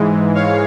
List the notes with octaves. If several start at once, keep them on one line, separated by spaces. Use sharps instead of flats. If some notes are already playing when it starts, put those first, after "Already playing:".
Already playing: G#2 E3 G#3
C#5 F5